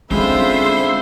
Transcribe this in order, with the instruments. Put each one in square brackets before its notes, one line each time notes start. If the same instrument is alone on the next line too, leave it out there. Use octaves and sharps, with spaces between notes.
[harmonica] D3 E5 B5 [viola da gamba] G#3 C4 F4 [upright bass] C#4 [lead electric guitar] C5